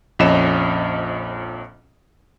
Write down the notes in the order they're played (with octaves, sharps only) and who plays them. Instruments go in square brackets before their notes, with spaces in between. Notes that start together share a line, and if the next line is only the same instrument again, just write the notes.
[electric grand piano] A#1 F2 C#4 D#5 E7